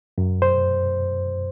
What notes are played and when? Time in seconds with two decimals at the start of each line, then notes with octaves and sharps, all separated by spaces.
0.18 F#2
0.42 C5